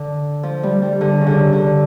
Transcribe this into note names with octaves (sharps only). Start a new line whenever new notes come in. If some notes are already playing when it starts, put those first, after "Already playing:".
Already playing: D3
F3
G3
G3
D3
C#3
D3
D3